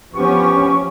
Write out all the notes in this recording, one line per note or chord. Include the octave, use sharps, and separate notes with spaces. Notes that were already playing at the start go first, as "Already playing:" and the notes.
F3 B3 C#4 G4 C#6